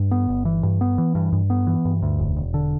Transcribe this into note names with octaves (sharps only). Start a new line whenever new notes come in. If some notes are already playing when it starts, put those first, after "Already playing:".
Already playing: G2
B3
G1
E3
G2
B3
E3
G2
G2
B3
E3
G2
D2
E1
E1
D3